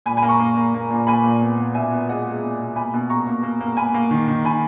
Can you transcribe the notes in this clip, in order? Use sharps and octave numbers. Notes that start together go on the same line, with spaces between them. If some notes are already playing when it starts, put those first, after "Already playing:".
A#2 G#5 B5
G#5 B5
A#3
A#5 C#6
A#3
A#3
A#3
A#2
A#3 G#5 B5
A#2
B3
B3
B2 E5 G#5
B3
G#3 D#5 F#5
G#3
B3
B2
A#3 G#5 B5
B2
B2 A#5 C#6
A#3
A#3
A#3
A#3 G#5 B5
A#3
D#3
D#3
D#3 G#5 B5